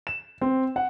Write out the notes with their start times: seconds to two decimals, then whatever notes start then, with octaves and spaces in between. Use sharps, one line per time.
0.07 E7
0.41 C4
0.76 F#5